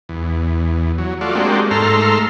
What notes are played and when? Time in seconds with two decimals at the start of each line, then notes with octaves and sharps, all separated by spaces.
0.09 E2
0.98 F#3
1.21 A3 F4 F#4 D5
1.35 G#3 A#3 C4 D4 F#4 G4
1.71 G#2 A3 A4 A#5 C6 F6